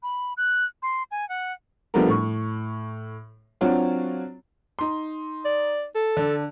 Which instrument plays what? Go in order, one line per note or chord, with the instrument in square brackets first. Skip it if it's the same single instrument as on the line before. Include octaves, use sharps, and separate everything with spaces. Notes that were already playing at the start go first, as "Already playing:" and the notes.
[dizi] B5
F#6
C6
G#5
F#5
[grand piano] F3 G3 A3 B3 D4 A#4
A2 C#6
F#3 C4 D4 F4 F#4 C#5
D#4 C6
[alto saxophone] D5
A4
[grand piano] D3